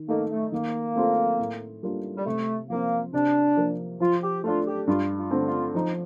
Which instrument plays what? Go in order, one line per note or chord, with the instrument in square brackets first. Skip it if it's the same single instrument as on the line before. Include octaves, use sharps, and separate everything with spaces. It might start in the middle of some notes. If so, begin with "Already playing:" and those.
Already playing: [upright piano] D#3
[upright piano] A3 D#4 A4 [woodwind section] A#3
[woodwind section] A3
[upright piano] D#3 [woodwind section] A#3
[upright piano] A3 C4 F4 A4
A2
G3 A#3 D4 F4
[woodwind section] G3
[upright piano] C3 [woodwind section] A3
[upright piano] F3 C4 [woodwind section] A#3
[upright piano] C3 [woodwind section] D4
[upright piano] F3 A#3
[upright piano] F3 [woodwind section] F4
[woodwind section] G4
[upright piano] A3 D4 [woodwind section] F4
[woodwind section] G4
[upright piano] G2 [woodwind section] F4
[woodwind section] F4
[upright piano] D3 A3 C4
[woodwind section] F4
[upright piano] F3 [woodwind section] D#4